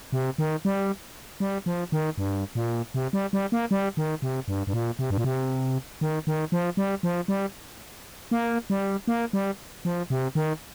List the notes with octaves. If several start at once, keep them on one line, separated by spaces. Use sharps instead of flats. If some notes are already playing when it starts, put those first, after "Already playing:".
C3
D#3
G3
G3
F3
D#3
G2
A#2
C3
G3
G3
A#3
G3
D#3
C3
G2
G2
A#2
C3
G2
A#2
C3
D#3
D#3
F3
G3
F3
G3
A#3
G3
A#3
G3
F3
C3
D#3